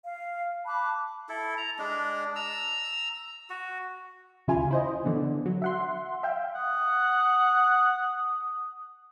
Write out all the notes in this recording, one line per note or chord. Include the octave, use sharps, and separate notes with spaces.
F5
A5 B5 D6 F#6
E4 A4
A#5
G#3 D4
A#5 E6
F#4
D#2 C#3 E4 F4 G#5
E4 C5 D#5
D3 E3 B3 D4
F#3
E5 F#5 C6
E5 F5 G5
F#5 D#6